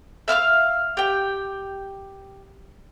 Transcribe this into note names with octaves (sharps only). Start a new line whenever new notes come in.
E5 F5 E6 F6
G4 G5